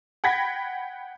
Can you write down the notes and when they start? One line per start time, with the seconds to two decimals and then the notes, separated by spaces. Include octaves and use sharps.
0.24 F#5 G5 B5 G#6 A#6 B6